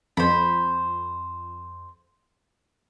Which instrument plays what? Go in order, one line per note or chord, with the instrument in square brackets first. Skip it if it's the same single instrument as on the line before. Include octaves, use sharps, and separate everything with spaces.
[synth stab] F2 [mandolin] C5 B5